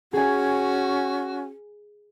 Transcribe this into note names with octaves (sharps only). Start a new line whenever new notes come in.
C#4 F#4 G#4 G#5